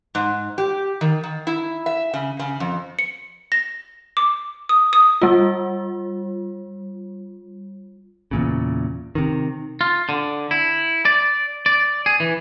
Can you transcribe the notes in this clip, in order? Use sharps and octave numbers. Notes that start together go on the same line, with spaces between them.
G#2
G4
D#3
D#3
E4
E5
C#3
C#3
F2
C#7
A#6
D6
D#6
D#6
G3 F4
E2 A#2 C#3
C3 D#3
F4
D3
E4
D5
D5
G#4
E3